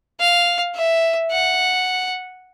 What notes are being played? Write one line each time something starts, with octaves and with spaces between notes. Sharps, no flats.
F5
E5
F#5